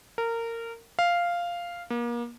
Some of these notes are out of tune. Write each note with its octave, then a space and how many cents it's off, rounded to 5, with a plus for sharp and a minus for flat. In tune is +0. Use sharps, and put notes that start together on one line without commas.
A#4 -20
F5 -5
A#3 +35